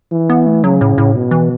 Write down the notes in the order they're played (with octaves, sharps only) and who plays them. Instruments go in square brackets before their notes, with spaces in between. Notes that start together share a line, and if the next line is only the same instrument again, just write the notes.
[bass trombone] E3
[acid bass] B3
A3
[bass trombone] C#3 [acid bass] F#3
[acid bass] A2
A2
[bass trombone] B2
[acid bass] E3